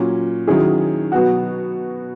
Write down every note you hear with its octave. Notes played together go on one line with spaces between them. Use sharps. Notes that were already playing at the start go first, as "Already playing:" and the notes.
Already playing: A#2 F#3 C#4
D#3 F#3 C#4 E4 G#4
B2 F#3 B3 F#4